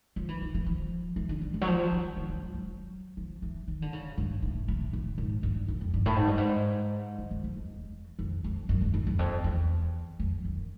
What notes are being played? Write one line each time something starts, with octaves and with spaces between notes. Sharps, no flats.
F3
E3
D#3
E3
F3
E3
D3
D3
D#3
F#3
F3
G3
D#3
D#3
F3
F#3
F3
E3
D#3
D3
C#3
G2
A2
A2
A2
G#2
G2
F2
F2
G2
A2
G#2
G2
G#2
G2
F#2
F2
E2
E2
F2
F2
F#2
G2
F#2
E2
F2
E2
F2
F#2